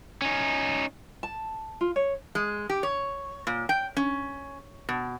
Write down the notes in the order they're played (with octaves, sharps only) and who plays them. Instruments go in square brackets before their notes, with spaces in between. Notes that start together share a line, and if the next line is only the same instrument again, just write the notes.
[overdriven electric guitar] C#4 D#4
[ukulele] A5
F4
C#5
[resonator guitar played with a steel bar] G#3
G4
C#5
A#2
G5
C#4
B2